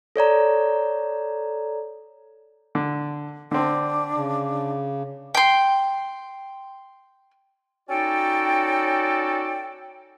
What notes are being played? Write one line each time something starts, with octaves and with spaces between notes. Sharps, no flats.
A4 C#5 D5 A#5
D3
D3 C4 D4
C#3
G5 C6
C#4 D#4 F#4 A4 D5 G5